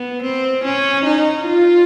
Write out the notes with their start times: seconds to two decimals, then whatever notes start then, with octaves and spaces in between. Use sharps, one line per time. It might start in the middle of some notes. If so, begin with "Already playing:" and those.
Already playing: B3
0.23 C4
0.65 C#4
1.05 D#4
1.47 F4